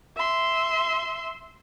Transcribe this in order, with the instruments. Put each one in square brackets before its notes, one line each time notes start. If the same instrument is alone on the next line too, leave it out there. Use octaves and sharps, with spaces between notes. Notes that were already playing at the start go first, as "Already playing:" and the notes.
[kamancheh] E5 C6